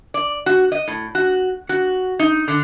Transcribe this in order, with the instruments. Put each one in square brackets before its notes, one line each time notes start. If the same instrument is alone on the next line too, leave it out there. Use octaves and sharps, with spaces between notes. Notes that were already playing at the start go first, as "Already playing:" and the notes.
[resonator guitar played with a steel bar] D5
F#4
D#5
A2
F#4
F#4
D#4
D3